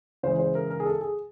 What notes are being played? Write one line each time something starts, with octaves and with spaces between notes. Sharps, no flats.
C#3 E3 G#3 C5
C5
A#4
A#4
G#4
A4
G#4